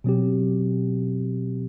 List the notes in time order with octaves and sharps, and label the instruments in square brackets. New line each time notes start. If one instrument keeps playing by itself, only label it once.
[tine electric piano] B2 F#3 C4 G4